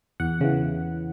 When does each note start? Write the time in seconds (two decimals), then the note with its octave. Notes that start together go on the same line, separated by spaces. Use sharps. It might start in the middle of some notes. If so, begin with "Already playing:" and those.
0.20 E2 F#5
0.41 C#3 E3